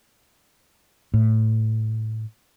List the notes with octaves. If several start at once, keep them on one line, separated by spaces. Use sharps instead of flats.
A2